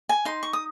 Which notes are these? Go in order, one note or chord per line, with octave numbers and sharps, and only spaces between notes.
G#5
D#4 C6
C#6
D#6